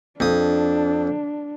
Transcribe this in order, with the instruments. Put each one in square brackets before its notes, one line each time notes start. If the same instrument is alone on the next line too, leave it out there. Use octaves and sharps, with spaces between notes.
[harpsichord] F2 D#6 [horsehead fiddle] D4